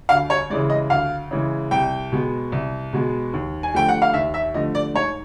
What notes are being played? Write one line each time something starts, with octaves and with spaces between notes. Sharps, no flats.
D2 F5
C#5
C#3 E3 G#3 D5
D#5
D2 F5
C#3 E3 G#3
C2 G5
B2 G#3 B3
C2
B2 G#3 B3
D#2
G#5
D3 F3 A3 G5
F#5
F5
D#2 E5
E5
D3 F3 A3 D#5
D5
G#2 C#5